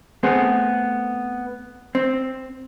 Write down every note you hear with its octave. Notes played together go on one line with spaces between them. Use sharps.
A3 B3 C4 G#4
C4